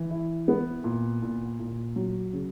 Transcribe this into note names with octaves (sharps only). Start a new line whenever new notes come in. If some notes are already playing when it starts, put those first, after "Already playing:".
Already playing: E3
E4
B3
A#2
A#2
A#2
F#3
C#3